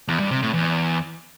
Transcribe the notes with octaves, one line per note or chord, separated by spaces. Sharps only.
E2
G2
C3
A2
E2